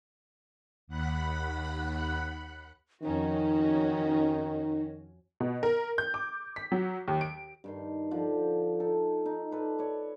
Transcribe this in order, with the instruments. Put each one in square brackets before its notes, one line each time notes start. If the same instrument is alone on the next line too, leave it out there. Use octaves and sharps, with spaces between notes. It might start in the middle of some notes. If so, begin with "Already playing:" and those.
[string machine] D#2 F#5 B5 F#6
[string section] F2 C#4 F#4 [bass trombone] D#3 [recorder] D#4
[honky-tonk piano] B2
A#4
G6
D6
B6
F#3
D#2
D7
[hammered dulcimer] G2 D#3 C6
D3 F3 C5 D5
D#4 A4
D#4
A4 B4 D5
C#5 D5